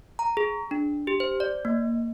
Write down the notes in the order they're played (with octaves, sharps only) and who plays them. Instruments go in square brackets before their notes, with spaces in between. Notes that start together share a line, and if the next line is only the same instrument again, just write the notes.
[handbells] A#5
G#4
D4
G4
C5
D5
A#3